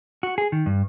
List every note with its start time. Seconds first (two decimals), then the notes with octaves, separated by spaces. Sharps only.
0.23 F#4
0.38 G#4
0.52 D#3
0.66 G2